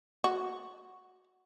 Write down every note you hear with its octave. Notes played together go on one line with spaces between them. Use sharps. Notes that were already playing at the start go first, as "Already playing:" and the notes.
F#4